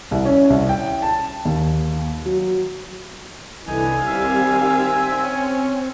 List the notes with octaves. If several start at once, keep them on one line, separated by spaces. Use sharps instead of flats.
C2
C#4
C2
G5
A5
D#2
F#3
C2 D3 E3 D#4 G#5
D#3 G3 C4 E5 F5
C#4 C#5